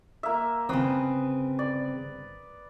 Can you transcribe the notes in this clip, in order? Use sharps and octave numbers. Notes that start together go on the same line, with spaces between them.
A#3 E5
G1 C#3 C4 B4 D#6
D5